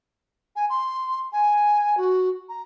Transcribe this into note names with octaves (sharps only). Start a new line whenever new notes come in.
G#5
C6
G#5
F#4
A#5